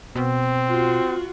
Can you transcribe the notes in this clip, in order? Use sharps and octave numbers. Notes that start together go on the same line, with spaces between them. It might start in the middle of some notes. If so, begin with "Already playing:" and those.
B2 C4
F4 F#4